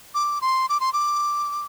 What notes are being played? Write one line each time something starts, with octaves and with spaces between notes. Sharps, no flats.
D6
C6
D6
C6
D6